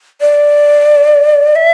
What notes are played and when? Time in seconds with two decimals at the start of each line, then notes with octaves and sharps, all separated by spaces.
0.21 D5
1.55 E5